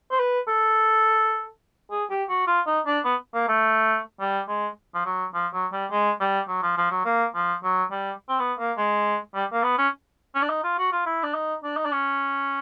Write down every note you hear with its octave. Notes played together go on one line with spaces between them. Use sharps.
C5
B4
A4
G#4
G4
F#4
F4
D#4
D4
B3
A#3
A3
G3
G#3
F3
F#3
F3
F#3
G3
G#3
G3
F#3
F3
F3
F#3
A#3
F3
F#3
G3
C4
B3
A#3
G#3
G3
A#3
B3
C#4
C#4
D4
D#4
F4
F#4
F4
E4
D4
D#4
D4
D#4
D4
C#4